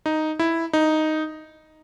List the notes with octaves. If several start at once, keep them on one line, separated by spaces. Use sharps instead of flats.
D#4
E4
D#4